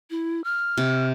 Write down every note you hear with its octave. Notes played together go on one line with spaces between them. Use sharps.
E4
F6
C3